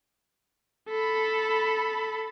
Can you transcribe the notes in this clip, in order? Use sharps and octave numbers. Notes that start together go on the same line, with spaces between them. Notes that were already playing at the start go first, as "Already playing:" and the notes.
A4 B5